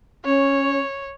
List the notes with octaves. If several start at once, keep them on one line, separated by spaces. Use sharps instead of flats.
C#4 C#5